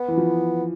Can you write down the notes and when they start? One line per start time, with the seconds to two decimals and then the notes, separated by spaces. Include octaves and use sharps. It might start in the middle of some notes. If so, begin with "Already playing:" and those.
Already playing: B3
0.08 E3
0.17 F3